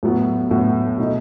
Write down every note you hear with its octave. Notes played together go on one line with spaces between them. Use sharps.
A2 F#3 B3 F#4
A2 F#3 B3 F#4
B2 A3 D#4